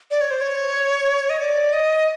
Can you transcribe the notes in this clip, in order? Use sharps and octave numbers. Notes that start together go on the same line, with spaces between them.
D5
C#5
C5
C#5
D#5
D5
D#5